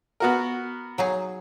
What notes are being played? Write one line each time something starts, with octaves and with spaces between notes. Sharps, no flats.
B3 F#4 A#4
F#3 D#4 G#4